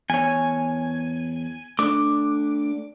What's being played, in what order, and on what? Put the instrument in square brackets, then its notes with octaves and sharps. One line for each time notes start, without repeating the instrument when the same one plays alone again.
[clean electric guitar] E2 C#5 [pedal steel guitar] G#5
[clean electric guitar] A3 D4 [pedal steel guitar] D6